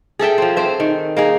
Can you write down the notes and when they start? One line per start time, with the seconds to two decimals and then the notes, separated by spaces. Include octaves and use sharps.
0.19 G#4 A4 E5 G5
0.38 F3 C4
0.57 C4 C5 E5
0.80 D#3
1.17 A#3 D#4 G#4